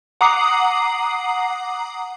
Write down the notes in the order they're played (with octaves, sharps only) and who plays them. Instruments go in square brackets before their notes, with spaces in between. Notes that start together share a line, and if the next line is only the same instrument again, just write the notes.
[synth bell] F#5 A#5 D6 D#6 C7